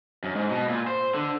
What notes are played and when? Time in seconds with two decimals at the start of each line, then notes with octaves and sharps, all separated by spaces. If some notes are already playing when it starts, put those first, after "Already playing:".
0.24 F#2
0.35 G#2
0.50 B2
0.69 A#2
0.87 C5
1.14 D3